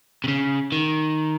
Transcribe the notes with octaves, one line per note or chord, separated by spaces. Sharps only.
C3
C#3
D#3